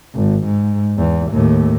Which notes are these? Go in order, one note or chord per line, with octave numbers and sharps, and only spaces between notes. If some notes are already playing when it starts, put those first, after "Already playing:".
G#1
G#2
E2
D#2 A2